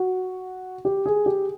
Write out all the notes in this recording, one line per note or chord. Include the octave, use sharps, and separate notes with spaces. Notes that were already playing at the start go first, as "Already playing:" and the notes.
Already playing: F#4
G4
G#4
G4